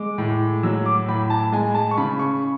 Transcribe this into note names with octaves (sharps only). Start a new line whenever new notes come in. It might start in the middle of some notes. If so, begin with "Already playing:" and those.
Already playing: G#3 D6
A2
F#3 E6
D6
A2 B5
A5
G#3 G#5
A5
C#6
C#3 B5
C#6